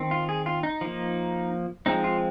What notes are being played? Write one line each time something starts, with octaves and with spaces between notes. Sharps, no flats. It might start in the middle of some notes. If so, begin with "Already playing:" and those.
Already playing: D#3 C4
F4
G#4
F4
D#4
F3 A#3
F3 G#3 C4 D#4
F4